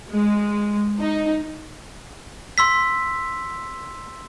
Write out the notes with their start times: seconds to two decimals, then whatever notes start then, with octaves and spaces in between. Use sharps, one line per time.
0.12 G#3
0.98 D#4
2.58 C6 E6 B6